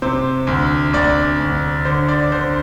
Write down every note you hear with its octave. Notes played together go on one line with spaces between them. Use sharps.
C3 C5
D2
D2 D5
D2
D3 C5
D5
D3 C5